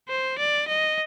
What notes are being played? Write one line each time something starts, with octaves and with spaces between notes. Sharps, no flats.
C5
D5
D#5